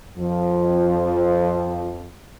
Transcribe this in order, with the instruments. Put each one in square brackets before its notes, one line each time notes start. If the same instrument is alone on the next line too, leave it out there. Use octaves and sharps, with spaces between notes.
[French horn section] F2 F3